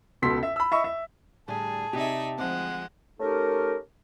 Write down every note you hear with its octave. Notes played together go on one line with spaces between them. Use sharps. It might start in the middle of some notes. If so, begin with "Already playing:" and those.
C#2 B2 A4 C6 B6
E5
B5 E6
D#5 E5 B5 C#6
E5
A2 D3 G3 G#4 A5
C3 D#4 G4 D5 E5
D2 F3 G#3 C4 F#5
A3 C#4 D#4 G4 A4 A#4